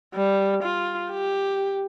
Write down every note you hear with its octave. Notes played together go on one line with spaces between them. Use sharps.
G3
F4
G4